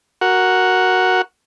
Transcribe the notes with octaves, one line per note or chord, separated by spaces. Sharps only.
F#4 A#4 F#5